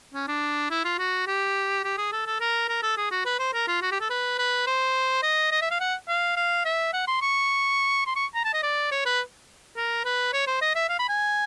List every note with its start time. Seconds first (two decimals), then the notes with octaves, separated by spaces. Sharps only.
0.14 C#4
0.28 D4
0.70 E4
0.84 F4
0.98 F#4
1.27 G4
1.83 G4
1.97 G#4
2.12 A4
2.26 A4
2.40 A#4
2.68 A#4
2.83 A4
2.97 G#4
3.11 F#4
3.25 B4
3.39 C5
3.53 A#4
3.67 F4
3.82 F#4
3.91 G4
4.01 A4
4.10 B4
4.38 B4
4.67 C5
5.23 D#5
5.51 D#5
5.61 E5
5.71 F5
5.80 F#5
6.08 F5
6.36 F5
6.65 E5
6.93 F#5
7.07 C6
7.22 C#6
8.06 C6
8.16 C#6
8.34 A#5
8.44 A5
8.53 D#5
8.63 D5
8.91 C#5
9.05 B4
9.76 A#4
10.05 B4
10.33 C#5
10.47 C5
10.61 D#5
10.75 E5
10.89 F5
10.99 B5
11.09 G#5